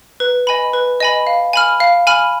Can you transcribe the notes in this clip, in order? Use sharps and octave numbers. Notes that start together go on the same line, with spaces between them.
B4
D#5 G#5 B5
B4
D#5 G#5 B5
F5
G#5 B5 F6
F5
G#5 B5 F6